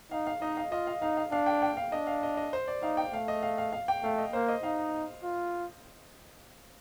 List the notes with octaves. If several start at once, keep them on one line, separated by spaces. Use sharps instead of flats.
D#4 F5
F5
D#4 D#5
F5
F4 D#5
F5
D#4 F5
F5
D4 F5
G5
G5
F5
D4 D#5
F5
D#5
D#5
C5
D5
D#4 F5
G5
A3 F5
D#5
F5
F5
F5
G5
A3 F5
D#5
A#3 C5
D#5
D#4 F5
F4